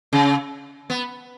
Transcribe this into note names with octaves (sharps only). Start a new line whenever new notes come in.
C#3
B3